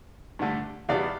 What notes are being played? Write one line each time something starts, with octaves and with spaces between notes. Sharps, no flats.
G2 D3 A3
E2 B2 G3 D5 F5